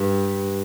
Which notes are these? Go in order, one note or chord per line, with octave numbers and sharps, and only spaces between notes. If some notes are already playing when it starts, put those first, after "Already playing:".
Already playing: G2